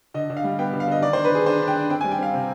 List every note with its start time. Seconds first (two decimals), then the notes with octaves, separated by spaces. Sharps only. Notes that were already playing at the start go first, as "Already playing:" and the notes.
0.14 D3 D#5
0.30 D3
0.37 F5
0.44 G3
0.59 B3 G5
0.73 D3
0.80 F5
0.88 D3 D#5
1.02 D#3 D5
1.13 D4 C5
1.25 B4
1.32 D#3 G#4
1.46 D4 C5
1.61 D4
1.67 G5
1.76 D4
1.90 C4 G5
2.01 G3 G#5
2.11 G5
2.19 C4 F5
2.34 C3